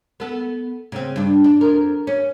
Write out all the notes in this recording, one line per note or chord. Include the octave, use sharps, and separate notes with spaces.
B3 A4
C#3 C4
G2 D4
D4
F2 A#4
C#4